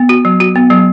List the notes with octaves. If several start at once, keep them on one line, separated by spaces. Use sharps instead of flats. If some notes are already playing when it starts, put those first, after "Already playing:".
Already playing: B3
F#4
F#3
F#4
B3
F#3